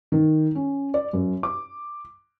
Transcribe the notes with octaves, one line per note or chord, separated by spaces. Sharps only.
D#3
C#4
D5
F#2
D6